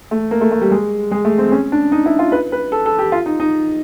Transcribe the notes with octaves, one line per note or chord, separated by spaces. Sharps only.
A3
A#3
A3
A3
G3
G#3
G#3
A3
C4
C#4
D4
D#4
E4
F4
B4
B4
A4
A4
G4
F4
D#4
D#4